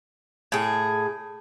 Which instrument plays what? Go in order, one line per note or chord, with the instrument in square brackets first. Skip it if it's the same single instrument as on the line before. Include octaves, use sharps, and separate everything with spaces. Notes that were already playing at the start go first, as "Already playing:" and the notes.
[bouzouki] A2 G#4